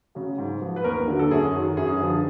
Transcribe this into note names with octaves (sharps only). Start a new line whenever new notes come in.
C#3 F#3
G#2
F3
B4
D#2 A#4
D3 F#3
A4
F#2 G#4
D#3 F#3
F#2 G#4
D3 F3